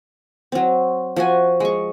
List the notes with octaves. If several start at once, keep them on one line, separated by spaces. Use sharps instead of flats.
F#3 C4
F3 F#4 G#5
G#3 C#6